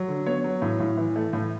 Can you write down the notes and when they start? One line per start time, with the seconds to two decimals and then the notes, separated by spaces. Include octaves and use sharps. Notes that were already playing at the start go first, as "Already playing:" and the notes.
Already playing: F#3
0.08 D3
0.26 B3 C#5
0.44 F#3
0.62 A2
0.80 A2
0.98 E3
1.16 A3
1.33 A2